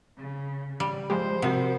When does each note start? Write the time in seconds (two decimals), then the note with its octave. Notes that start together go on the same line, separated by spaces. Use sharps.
0.17 C#3
0.80 G3
1.10 F3 G#3 G4 C5
1.42 C3 F#4 A#4 F#5